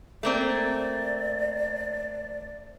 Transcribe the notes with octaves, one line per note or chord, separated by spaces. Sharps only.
A3 A#3 C4 D5